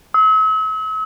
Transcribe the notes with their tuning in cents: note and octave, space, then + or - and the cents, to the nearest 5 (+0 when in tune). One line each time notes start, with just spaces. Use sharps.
E6 -45